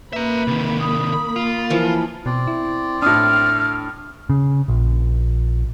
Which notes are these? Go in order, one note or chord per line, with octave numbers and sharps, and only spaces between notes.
A#3 B4 E5 A#5 B5
C3 D#3
D#6
F4
E3 F3 A#4
B2 C4 D5
E4
A2 D4 D#6 F6
C#3
A#1